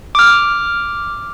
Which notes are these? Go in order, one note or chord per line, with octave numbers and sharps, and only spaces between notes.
D6 F6